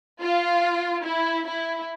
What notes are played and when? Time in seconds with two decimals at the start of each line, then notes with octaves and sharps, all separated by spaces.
0.19 F4
1.03 E4
1.45 E4